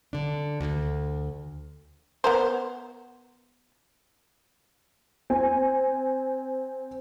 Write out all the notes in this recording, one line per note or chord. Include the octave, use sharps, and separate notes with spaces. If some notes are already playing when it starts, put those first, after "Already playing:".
D3 D4
D2
B3 A#4 C5
C4 G#5